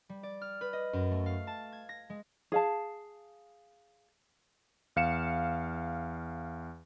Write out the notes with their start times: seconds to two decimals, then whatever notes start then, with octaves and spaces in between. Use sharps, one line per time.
0.09 G3
0.23 D5
0.42 F6
0.61 B4
0.73 D#5
0.93 F#2
1.11 A3
1.26 F5
1.47 A5
1.72 G#6
1.89 A#6
2.10 G#3
2.52 G#4 F5 A5
4.96 E2 F5 C#7 E7